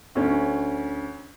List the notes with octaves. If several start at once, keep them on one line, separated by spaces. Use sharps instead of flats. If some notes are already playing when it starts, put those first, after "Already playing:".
D2 C#4